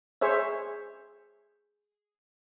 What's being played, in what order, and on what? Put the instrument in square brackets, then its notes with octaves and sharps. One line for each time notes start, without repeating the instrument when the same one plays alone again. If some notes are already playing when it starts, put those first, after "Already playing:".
[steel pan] G#4 C5 C#5 E5